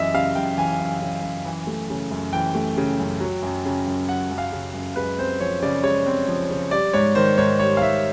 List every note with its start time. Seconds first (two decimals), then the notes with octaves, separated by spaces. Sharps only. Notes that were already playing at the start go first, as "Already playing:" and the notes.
Already playing: F#2 E3 D#5 E5
0.14 C#3 F5
0.35 F#2 G5
0.57 E3 G#5
0.79 F#2
1.01 C#3
1.23 F#2
1.45 E3
1.67 A3
1.90 C#3
2.11 F#2
2.33 E3 G5
2.55 A3
2.77 C#3
2.99 F#2
3.20 F#3
3.43 F#2
3.65 C#3
3.87 F#2
4.09 F#3 F#5
4.31 F#2
4.38 F5
4.52 C#3
4.74 F#2
4.96 G#3 B4
5.18 C4 C5
5.40 F3 C#5
5.62 C#3 D5
5.83 G#3 C#5
6.07 C4
6.28 F3
6.50 C#3
6.71 G3 D5
6.93 G#2 C#5
7.15 D#3 C5
7.38 G#2 C#5
7.59 G3 C#5
7.77 F5
7.81 G#2 E5